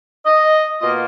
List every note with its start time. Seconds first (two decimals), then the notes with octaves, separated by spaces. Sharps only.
0.26 D#5
0.81 B2 A#3 F4 D#5